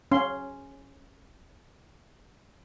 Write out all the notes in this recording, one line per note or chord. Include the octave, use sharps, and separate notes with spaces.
C#4 C6